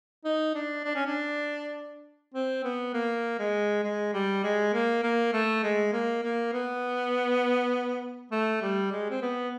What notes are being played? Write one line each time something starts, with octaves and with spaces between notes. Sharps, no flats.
D#4
D4
D4
C#4
D4
C4
B3
A#3
G#3
G#3
G3
G#3
A#3
A#3
A3
G#3
A#3
A#3
B3
A3
G3
G#3
C4
B3